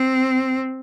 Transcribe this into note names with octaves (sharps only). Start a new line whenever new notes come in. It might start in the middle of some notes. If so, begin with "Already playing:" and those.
Already playing: C4